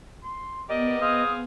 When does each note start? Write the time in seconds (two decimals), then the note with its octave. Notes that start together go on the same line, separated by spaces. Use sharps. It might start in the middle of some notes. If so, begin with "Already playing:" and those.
0.23 C6
0.69 B3 G4 A#4 D5 D#5
1.01 C4 G#4 F5 D#6